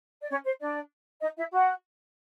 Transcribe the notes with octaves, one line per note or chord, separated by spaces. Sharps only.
D5
C#4 C#5
C5
D4 D5
D#4 D#5
E4 E5
F#4 F#5